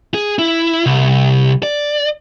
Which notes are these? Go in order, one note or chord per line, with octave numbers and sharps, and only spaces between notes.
G#4
E4
C2
D5